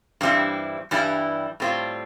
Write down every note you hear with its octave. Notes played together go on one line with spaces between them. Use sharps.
G2 E3 G3 C4 E4
G2 E3 G3 E4
A2 G3 C4 F4